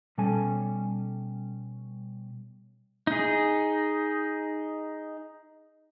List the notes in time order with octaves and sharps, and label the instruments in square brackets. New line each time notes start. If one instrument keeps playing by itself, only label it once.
[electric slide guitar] B2 G3 C#4 A4 G#5
[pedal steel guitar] D#4 G#4